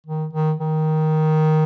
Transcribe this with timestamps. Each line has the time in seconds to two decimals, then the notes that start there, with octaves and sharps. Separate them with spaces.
0.07 D#3
0.33 D#3
0.60 D#3